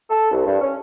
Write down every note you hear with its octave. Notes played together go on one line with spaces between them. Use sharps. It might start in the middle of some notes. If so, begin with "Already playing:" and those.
A4
C2
G2
C#4